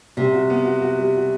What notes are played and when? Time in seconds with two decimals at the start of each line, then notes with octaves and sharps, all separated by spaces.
0.17 C3 G3
0.34 F#4
0.50 B3
0.65 F#4
0.82 F#4
0.98 G3
1.15 F#4